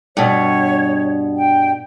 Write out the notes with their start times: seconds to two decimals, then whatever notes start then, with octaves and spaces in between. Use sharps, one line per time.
0.17 G2 B2 C#5
1.37 G5